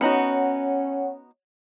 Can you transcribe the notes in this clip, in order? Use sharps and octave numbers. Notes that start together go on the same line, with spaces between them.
B3 C#4 D#4 F#4 C#5 F#5